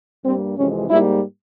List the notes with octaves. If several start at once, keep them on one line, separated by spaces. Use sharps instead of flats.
G2 G3 A#3 C4
F2 C3 E3 G#3 C#4
G#2 G3 A#3 E4